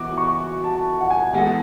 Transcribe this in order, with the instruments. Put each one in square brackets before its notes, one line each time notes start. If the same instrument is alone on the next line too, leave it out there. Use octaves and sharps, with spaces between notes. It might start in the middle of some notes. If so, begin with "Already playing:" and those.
Already playing: [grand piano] E3 B3 F#4 [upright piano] D6
[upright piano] C#6
A5
F#5
G#5
[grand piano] E3 G#3 B3 E4 A4 [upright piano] F#5